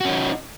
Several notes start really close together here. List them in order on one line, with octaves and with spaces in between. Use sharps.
F#4 C#4 D#4